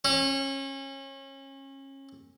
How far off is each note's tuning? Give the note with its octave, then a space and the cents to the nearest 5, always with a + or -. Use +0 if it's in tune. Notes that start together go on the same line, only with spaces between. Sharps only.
C#4 -30